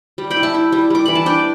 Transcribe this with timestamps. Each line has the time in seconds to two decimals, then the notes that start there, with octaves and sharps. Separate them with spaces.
0.18 G3
0.30 G5 B5
0.36 E4
0.43 E5 A5
0.54 E4
0.72 G3
0.90 G3 D6
1.05 E3 B5
1.15 A5
1.26 D4 D5 G5